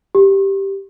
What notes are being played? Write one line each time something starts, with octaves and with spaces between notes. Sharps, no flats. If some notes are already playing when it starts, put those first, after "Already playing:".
G4